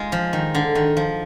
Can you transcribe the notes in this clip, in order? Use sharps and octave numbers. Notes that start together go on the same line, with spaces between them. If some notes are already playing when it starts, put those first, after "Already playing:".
Already playing: G#3 D#4 F4
F3
D#3
D3
D#3
F3